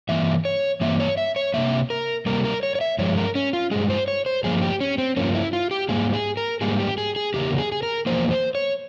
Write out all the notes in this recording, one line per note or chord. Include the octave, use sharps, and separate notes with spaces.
G2 E3 A#3 E5
C#5
G2 E3 A#3 E5
C#5
E5
C#5
C3 G3 A#3 E5
A#4
C3 G3 A#3 A#4
A#4
C#5
C#5
E5
G2 F3 G#3 C#5
A#4
C#4
F4
G2 F3 G#3 G#4
C5
C#5
C5
G2 F3 A#3 G#4
G#4
G4
C#4
C4
G2 F3 A#3 C#4
E4
F4
G4
G#2 G3 A#3 G#4
G#4
A#4
G#2 G3 A#3 G#4
G4
G#4
G#4
E2 C#3 A#3 G4
G#4
G#4
A#4
E2 C#3 F3 A#3 C5
C5
C#5